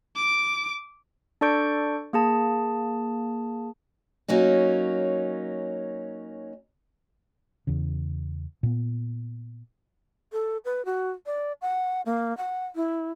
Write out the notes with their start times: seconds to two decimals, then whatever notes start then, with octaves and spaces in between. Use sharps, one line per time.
0.15 D6 D7
1.41 D4 A4 D5 C#6 G6 D7
2.13 A#3 G#4 A5
4.28 F#3 A#3 C#4 D#4
7.67 E2 C#3
8.63 A#2 B3
10.32 A4
10.65 B4
10.85 F#4
11.26 D5
11.62 F#5
12.06 A#3
12.37 F#5
12.75 E4